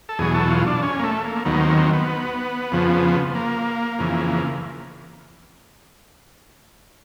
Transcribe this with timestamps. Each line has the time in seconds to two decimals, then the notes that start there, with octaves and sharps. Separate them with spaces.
0.09 A4
0.19 E2 B2 F#3 G#4
0.35 A4
0.50 F4
0.66 D4
0.82 C#4
0.99 A#3
1.03 A3
1.24 A#3
1.45 D#2 D#3 F#3 B3
1.61 C4
1.77 C4
1.93 B3
2.72 F2 C#3 F3
3.35 A#3
3.99 F2 C#3 E3